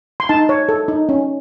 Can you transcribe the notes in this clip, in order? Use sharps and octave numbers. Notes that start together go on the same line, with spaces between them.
C6
D#4 A5
C#5
A4
D#4
C#4